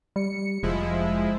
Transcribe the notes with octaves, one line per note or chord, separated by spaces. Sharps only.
G3 C#7
F1 F3 G#3 E4